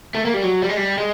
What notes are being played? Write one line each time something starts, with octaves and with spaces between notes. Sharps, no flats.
A3
A#3
G3
F#3
G3
G#3
G3
G#3